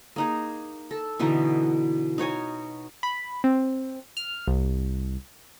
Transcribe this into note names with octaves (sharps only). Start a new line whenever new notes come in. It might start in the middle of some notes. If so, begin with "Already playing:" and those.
A#3 D#4 G#4
A4
B2 D3 E3 D#4
D#4 F#4 C#5 G#5
B5
C4
F6
C2